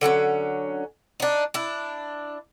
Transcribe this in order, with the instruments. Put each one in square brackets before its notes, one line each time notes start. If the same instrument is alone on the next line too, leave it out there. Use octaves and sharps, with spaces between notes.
[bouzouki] D3 F#3 C4 C#4
D4 D#4
D4 E4